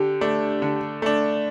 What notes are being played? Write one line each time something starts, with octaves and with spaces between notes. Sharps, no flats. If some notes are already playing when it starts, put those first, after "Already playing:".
Already playing: D3 G4
A3 D4
D3
A3 D4